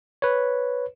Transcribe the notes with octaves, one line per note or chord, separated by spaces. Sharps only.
B4 C#5